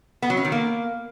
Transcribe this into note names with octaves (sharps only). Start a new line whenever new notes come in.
B3
F#3
C#4
D#3
A#3